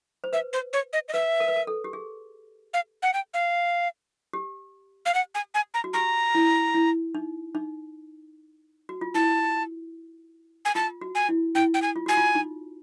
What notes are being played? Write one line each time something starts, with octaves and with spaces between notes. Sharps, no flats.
C5
B4 E5
C5
C#5
D#5
D#5
B4 E5
A#4
B4
A#4
A4
G4
G#4
F5
F#5
G5
F5
G4
F5
F#5
G#5
G#5
A#5
F#4
G4 A#5
E4
E4
D#4
D#4
F#4
F4
E4 A5
G#5
F4 A5
F#4
G#5
E4
E4 G5
G5
G#5
F4
F#4 G#5
F4
D#4